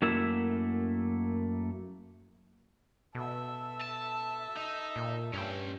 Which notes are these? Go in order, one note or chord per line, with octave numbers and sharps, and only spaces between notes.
F#2 A3 A#3 E4 E5
B2 A4 E5
A5
D#4
A#2
G2 C#4 G5